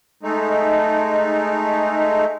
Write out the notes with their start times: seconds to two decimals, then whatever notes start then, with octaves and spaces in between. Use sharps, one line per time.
0.23 G#3 A3 D#4